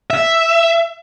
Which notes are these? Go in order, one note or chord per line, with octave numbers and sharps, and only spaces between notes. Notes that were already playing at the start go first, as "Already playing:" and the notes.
E5